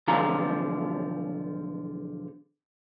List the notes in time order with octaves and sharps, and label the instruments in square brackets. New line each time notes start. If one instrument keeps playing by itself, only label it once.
[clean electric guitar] B1 E2 D3 F3 F4 A#5